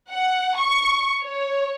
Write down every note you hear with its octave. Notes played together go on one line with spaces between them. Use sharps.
F#5
C#6
C#5